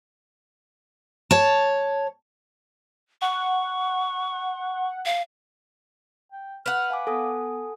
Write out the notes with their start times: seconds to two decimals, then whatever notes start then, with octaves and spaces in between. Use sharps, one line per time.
1.31 C#5 A5
3.22 F#5 C#6
5.06 F5
6.32 G5
6.66 B4 F#5 F6
6.90 F5 G#5 D6
7.07 B3 A4 G#5 D#6